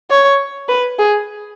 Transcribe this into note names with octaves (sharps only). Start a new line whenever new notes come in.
C#5
B4
G#4